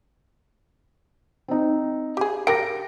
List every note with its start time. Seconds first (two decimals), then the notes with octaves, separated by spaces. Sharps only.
1.48 C4 D#4
2.17 G4 G#4
2.47 G4 A#4 G5 A#6 D7